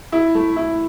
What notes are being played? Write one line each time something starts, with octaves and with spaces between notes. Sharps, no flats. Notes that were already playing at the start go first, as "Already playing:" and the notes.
E4
A3
E4